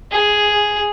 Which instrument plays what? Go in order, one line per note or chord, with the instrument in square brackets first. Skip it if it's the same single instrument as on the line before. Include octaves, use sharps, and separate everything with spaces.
[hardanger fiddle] G#4